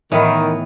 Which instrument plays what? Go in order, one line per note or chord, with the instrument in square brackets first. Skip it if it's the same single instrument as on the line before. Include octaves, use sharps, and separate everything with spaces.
[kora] A2 E3 B3 [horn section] D#3